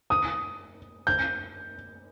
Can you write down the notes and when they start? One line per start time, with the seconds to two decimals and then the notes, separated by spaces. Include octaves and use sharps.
0.10 D#6
1.07 G6